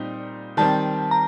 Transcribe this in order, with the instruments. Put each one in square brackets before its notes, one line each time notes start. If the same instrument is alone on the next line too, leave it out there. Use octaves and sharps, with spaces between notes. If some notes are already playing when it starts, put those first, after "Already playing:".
Already playing: [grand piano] A#2 G3 C4 D#4
[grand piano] D#3 G3 C4 [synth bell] A5
[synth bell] A#5